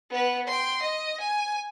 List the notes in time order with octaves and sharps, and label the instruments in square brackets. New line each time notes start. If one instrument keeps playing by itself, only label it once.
[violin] B3 B4
G5 C6
D#5
G#5